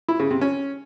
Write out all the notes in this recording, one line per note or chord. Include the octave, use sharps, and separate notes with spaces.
E4
C#3
C3
C#4